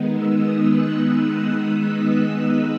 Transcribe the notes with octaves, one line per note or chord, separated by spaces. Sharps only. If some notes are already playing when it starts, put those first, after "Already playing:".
Already playing: D#3 G#3 B3 D#4
E6
D#6
F#6